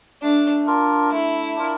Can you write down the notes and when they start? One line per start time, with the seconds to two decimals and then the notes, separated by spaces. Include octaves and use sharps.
0.22 A3 D4
0.67 D4 F4 A#4
1.11 A3 E4
1.56 D4 F4 A#4